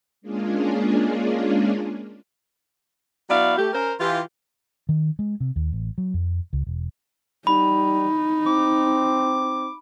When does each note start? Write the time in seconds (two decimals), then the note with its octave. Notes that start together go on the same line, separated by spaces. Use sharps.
0.22 G#3 A#3 C#4 D4 F4 G#4
3.30 F#3 B3 E4 F#4 D5 F5
3.57 A3 G4
3.73 C#4 A#4 C5
4.00 E3 F4 G4
4.89 D#3
5.19 G#3
5.40 C3
5.56 D#2
5.72 A1
5.98 F#3
6.14 F2
6.53 C#2
6.67 E1
7.47 G3 D#4 B5
8.46 C4 D6